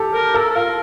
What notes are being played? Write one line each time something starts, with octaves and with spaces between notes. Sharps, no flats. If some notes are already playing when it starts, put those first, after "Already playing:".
Already playing: G4 A4
A#4
A4 A#4
A4
F4 A#4